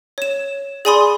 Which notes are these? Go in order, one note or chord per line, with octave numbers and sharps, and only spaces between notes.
C#5 E7
G#4 D5 G#5 B5 C6 D#6